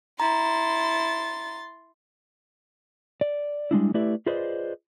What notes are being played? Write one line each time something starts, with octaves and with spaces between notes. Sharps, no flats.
E4 A#5 C6 A6
D5
G3 G#3 D4 E4
A3 E4 G4 B4 D5 E5
F4 G#4 B4 C5 D5 D#5